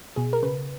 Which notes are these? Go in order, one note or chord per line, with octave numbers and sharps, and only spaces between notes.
B2 G#4
A#4
C#3 B4